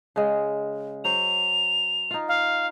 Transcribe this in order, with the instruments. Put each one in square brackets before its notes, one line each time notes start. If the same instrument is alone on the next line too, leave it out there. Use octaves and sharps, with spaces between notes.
[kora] C#3 G#3
[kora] F#3 C5 [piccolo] F7
[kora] D#4 F4
[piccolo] F5